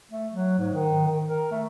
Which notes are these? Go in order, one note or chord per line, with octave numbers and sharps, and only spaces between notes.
A3
F#3
G#2
D#3
D#3
A#4
A3